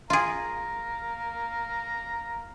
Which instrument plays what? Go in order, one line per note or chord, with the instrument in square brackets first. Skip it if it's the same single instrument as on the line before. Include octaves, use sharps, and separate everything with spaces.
[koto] F4 G#4 [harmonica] F5 A#5